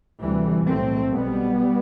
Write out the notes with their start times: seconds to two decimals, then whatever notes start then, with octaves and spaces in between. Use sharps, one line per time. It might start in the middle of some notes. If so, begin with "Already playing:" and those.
0.21 D2 C3 E3 G3
0.67 B1 A2 A3 C4
1.13 B1 B2 G3 B3